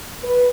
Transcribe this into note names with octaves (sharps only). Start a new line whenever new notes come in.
B4